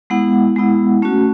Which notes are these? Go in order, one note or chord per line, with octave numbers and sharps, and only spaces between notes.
G#3 B3 E4 F#5
G#3 B3 E4
A3 C#4 F#4